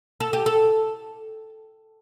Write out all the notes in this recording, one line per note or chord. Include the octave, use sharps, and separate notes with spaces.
A4
G4
A4